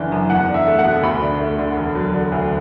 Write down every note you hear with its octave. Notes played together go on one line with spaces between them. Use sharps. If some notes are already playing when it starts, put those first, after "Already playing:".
Already playing: F#1 D3 E3 D4
F#2
E2 F#5
D4
E5
A3
F#5
B2
D2 B5
D4
A3
D3
E1
F#3
D3
D2